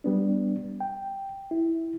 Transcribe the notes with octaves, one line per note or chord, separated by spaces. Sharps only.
G3 B3 D4
G5
E4